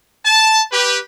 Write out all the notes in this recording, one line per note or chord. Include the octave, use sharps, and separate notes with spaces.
A5
G4 B4